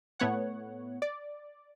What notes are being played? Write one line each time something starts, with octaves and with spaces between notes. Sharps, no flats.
A2 A3 B3 C#5 F#5
D5